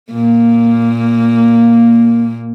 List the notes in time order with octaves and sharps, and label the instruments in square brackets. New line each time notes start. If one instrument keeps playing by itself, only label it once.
[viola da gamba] A#2 A#3